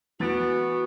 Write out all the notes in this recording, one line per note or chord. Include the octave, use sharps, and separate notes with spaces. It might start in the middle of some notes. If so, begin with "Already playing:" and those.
E3 B3 F#4 A6 D7